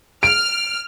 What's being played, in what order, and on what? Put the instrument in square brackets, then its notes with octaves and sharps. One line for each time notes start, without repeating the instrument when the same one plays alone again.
[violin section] F6 [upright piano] D7